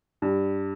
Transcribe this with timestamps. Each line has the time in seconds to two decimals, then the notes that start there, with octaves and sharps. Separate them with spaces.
0.22 G2